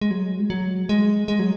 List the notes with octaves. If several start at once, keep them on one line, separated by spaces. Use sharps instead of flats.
G#3
F#3
G#3
F#3
G#3
G#3
F#3